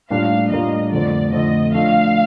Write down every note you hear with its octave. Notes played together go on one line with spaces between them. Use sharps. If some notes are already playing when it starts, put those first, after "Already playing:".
A2 G3 A#3 D4 F4 F5
A2 G3 A#3 D4 F4 D#5
F2 D3 F3 A3 C4 D5
F2 D3 F3 A3 C4 D#5
F3 A3 D4 F5